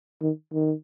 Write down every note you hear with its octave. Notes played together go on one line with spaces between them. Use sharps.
D#3
D#3